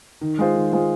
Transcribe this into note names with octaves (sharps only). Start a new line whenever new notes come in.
D#3
G#3 F4 C5
D#3
G#3 F4 C5